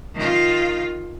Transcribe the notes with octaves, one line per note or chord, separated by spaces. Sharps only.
D#3 F4